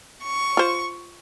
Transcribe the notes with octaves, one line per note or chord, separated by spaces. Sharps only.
C#6
F4 C5